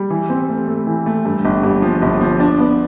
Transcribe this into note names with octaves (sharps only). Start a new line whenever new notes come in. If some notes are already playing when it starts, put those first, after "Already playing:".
Already playing: G3
E3
C4
A3
A3
E3
A3
G2
G1
G2
F3
G1
F3
D4
B3